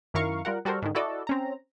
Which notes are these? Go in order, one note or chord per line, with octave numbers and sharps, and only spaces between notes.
F#2 D#3 E4 A#4 F5 C#6
G3 F4 A#4 F#5
G3 F#4 A4 A#4 C5
G#2 D3 D#3
E4 F#4 A4 D5 D#5
C4 C#4 A#5